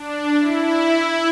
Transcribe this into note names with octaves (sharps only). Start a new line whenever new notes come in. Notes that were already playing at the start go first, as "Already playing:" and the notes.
Already playing: D4
E4